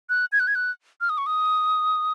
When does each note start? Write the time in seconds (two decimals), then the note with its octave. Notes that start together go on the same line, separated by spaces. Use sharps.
0.10 F#6
0.32 G#6
0.40 F#6
0.47 G#6
0.55 F#6
1.01 F6
1.09 D#6
1.18 C#6
1.26 D#6